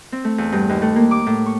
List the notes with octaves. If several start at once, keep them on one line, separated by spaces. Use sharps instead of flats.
C4
A3
E2
G2
D#2
A3
A#3
D6
A2
C#6